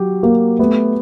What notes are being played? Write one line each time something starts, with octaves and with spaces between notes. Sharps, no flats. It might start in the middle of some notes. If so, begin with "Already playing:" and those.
Already playing: F#3 G4
A#3 G4
A3 B3